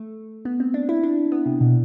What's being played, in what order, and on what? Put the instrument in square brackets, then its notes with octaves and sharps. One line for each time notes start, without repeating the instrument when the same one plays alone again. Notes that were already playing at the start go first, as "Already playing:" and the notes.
Already playing: [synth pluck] A3
B3
C4
D4
E4
D4
B3
C3
B2